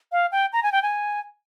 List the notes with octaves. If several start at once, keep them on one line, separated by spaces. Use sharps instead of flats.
F5
G5
A#5
G#5
G5
G#5